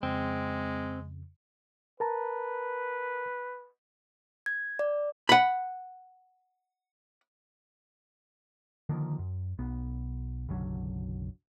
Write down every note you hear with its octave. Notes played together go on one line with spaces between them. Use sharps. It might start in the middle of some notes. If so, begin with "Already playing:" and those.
F2 C#3 G#3 C4
A#4 B4 A5 A#5
G#6
D5
F#5 B5
D3 D#3 F3 A#3
F#2
B1 B3
F#1 B1 D3 F#3